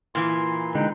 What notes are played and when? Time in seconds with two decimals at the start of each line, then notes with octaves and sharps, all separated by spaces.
0.15 A#2 E3 C6
0.75 D3 G#3 D#4 G5 F#6